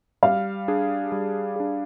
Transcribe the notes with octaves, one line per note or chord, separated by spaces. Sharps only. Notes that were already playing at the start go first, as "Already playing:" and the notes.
G3 F5
D4 G#4
G3
D4 G#4